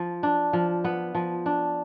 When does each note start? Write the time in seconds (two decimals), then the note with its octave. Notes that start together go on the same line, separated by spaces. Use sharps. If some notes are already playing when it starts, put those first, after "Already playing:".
Already playing: F3
0.23 D4
0.53 F3
0.84 B3
1.15 F3
1.46 D4